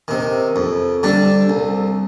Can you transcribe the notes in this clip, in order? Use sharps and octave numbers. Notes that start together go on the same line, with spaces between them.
C3 D#3
F2
D3 G3 D4
C2